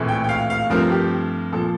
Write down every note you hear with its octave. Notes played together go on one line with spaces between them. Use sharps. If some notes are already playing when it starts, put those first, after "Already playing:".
Already playing: A#1 A2 E3 A3 C4
G5
G5
F5
F5
G2 F3 A3 C4 A#4
G4
A#2 F3 A4